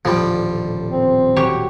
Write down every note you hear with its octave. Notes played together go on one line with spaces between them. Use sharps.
D#1 A2 D3 F3 G3
C4
F#3 G4 C#5